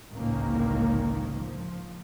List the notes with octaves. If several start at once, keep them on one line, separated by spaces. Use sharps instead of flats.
G#1 C#2 A2 D3 D#3 A#3
F3